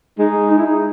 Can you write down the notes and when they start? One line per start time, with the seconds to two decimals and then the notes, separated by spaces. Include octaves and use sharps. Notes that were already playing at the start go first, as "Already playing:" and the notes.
0.19 G#3 D#4
0.50 D#4
0.58 E4
0.65 D#4